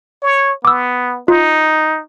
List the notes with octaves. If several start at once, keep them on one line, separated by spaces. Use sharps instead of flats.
C#5
B3 D6 E6
D#4 F4